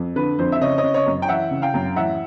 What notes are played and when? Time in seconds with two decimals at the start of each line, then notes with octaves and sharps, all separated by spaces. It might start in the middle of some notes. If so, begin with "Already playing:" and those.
Already playing: F2
0.16 D3 B4
0.39 F2 C5
0.52 E5
0.61 C#3 C#5 D#5
0.78 C#5 D#5
0.83 C#3
0.94 C#5 D#5
1.06 F#2
1.22 G5
1.28 E3 E5 F#5
1.51 C#3
1.62 F5 G5
1.74 F#2
1.96 A1 E5 F#5